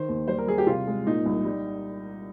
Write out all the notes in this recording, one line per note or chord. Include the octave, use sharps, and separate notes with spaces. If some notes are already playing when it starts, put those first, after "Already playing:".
Already playing: D#3 C5
D#2
G3 C5
A#4
G3 G#4
G4
C3 F4
G#3
A#2 D#4
C2
G3